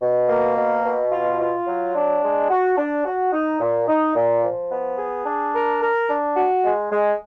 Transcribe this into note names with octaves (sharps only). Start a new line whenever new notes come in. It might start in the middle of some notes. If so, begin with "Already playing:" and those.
B2
A#3
B2
B2
F4
F4
F#3
D4
G#3
F#4
D4
F#4
D#4
A#2
D#4
A#2
F3
B3
G#4
D4
A#4
A#4
D4
F#4
G#3
G#3